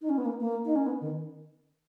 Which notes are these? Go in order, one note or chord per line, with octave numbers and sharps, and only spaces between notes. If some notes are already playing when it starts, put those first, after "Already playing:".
D#4
C#4
B3
A#3
A#3
D#4
C#4
B3
D#3